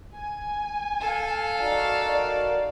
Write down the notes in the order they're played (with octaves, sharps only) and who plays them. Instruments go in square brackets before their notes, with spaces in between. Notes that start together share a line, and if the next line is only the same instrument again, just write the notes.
[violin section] G#5
[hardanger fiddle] A4 F5
[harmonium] D#4 F#4 A#4 [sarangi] D5